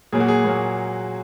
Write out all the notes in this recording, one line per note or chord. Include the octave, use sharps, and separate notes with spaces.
A#2 F#3 A#3 G#4
F#4
G#4
A#2 F#3 A#3